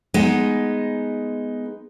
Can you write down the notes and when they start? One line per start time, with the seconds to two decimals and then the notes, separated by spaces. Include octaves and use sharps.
0.14 G#3 B3 D#4